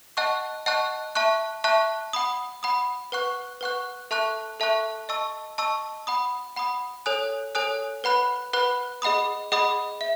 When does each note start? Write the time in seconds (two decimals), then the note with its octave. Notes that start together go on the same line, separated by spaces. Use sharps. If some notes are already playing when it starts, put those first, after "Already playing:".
0.17 D#5 F#5 A5 C#6 F#6
0.66 D#5 F#5 A5 C#6 F#6
1.15 E5 A5 C#6 F#6
1.64 E5 A5 C#6 F#6
2.13 F#5 B5 D#6
2.63 F#5 B5 D#6
3.12 B4 F#5 C#6 F#6
3.61 B4 F#5 C#6 F#6
4.11 A4 E5 A5 C#6 F#6
4.60 A4 E5 A5 C#6 F#6
5.09 D#5 A5 C#6 E6
5.58 D#5 A5 C#6 E6
6.07 F#5 B5 D#6
6.56 F#5 B5 D#6
7.06 A4 C#5 G#5 D#6 F#6
7.55 A4 C#5 G#5 D#6 F#6
8.04 B4 F#5 B5 F#6
8.53 B4 F#5 B5 F#6
9.02 G#4 D#5 F#5 B5 D#6
9.52 G#4 D#5 F#5 B5 D#6
10.01 E5